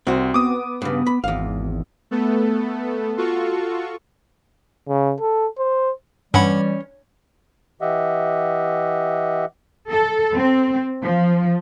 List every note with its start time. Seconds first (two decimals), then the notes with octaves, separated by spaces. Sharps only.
0.07 C2 C4 F#4
0.34 B3 D6 D#6
0.82 G2 C#3
1.07 B5
1.24 G#1 E2 F5
2.11 A3 B3 A4
3.17 F4 F#4 A4 C#6
4.88 C#3
5.20 A4
5.59 C5
6.34 G2 E3 G3 C#4 F#5 B5
7.81 E3 G4 D#5 E5 F#5
9.89 A4
10.36 C4
11.02 F3